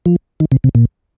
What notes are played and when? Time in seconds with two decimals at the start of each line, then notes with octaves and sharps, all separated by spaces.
0.06 F3
0.40 D#3
0.52 C3
0.64 C3
0.75 A#2